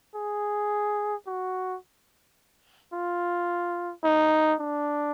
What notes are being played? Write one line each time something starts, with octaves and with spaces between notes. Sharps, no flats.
G#4
F#4
F4
D#4
D4